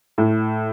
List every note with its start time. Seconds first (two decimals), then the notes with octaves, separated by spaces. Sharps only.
0.18 A2